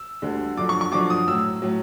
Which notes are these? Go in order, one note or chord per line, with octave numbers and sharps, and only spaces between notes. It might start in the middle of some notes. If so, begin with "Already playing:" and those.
Already playing: E6
D2 D3 G3
F#2 D3 F3 D6
C#6
C#6
F#2 D3 F3 D6
D#6
A2 F#3 E6
A2 F#3